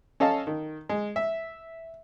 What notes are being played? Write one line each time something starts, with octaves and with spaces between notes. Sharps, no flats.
C#4 A4 D#5 F5 A5
D#3
G#3
E5